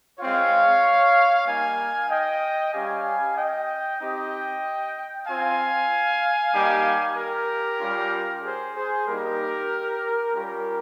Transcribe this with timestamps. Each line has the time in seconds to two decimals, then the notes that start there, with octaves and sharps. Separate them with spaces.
0.19 G#3 C4 F4 C#5 F5
1.46 G3 A#3 D#4 F5 G#5
2.09 D#5 G5
2.73 G3 C#4 G4 F5 G#5
3.37 D#5 G5
4.00 C4 D#4 G4 D#5 G5
5.27 C4 F4 F5 G#5
6.54 G3 A#3 D#4 G4
7.17 G4 A#4
7.81 G3 C#4 F4
8.44 G#4 C5
8.76 G#4 C5
9.07 G3 A#3 D#4 G4 A#4
10.34 G3 C#4 F4 G4 A#4